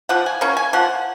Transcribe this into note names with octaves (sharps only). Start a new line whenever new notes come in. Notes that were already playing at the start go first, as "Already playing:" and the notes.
F3 F#5
G#5
A#3 C#4
G#5
F3 F#5